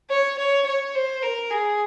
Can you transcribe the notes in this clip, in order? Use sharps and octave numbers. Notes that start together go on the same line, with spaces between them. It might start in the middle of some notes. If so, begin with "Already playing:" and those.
C#5
C#5
C#5
C5
A#4
G#4